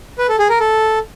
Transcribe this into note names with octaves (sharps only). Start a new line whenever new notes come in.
B4
A4
G#4
A#4
A4